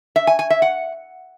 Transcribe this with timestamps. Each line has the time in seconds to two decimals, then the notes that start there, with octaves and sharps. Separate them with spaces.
0.16 E5
0.27 G#5
0.39 G#5
0.50 E5
0.62 F#5